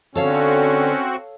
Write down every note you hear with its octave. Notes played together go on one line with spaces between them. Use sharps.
D3 C4 C#4 F#4 A4 C#5 F5